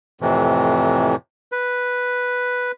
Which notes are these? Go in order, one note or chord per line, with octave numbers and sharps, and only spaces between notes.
F2 A2 C3 E3
B4